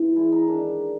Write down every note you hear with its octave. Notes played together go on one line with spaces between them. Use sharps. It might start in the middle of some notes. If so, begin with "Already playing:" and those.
Already playing: E3
G#3 E4
D#4
D#3 D4